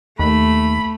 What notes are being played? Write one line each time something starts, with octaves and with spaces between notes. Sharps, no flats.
D#2 A3 B5